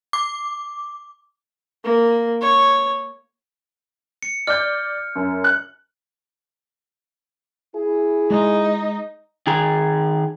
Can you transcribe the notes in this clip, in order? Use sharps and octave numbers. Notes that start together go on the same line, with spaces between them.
D6
A#3
C#5
C#7
D5 F6 G6
F#2
F#6
E4 G#4
G#3 D#4
D#3 G#4 A#5